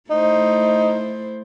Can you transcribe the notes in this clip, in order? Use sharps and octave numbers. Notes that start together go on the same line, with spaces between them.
A3 D#4 E4 C5